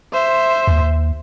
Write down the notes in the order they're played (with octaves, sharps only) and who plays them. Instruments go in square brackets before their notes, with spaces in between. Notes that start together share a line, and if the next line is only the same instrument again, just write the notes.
[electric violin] C5 E5
[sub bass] D#2